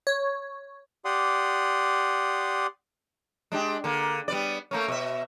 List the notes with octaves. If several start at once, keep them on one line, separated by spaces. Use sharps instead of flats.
C#5
G4 D5 F#5 C6 D#6
G#3 D4 G4
D3 A#3
G3 B3 D5
A3 A#3 C#4
B2 E5